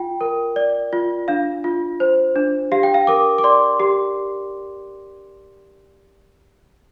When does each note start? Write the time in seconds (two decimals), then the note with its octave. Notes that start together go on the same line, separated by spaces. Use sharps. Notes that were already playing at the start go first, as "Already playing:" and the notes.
Already playing: F4 G5
0.21 A#4
0.56 D5
0.93 F4
1.28 D4 F5
1.64 F4
2.00 C5
2.36 D4
2.72 G4 F5
2.83 G5
2.94 F5
3.07 A#4 D6
3.38 D6
3.44 D5 C6
3.80 G4